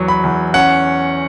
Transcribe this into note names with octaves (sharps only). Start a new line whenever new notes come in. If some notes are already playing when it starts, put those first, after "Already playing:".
Already playing: E2 F#3 C#6
B5
E2
C#4 F#5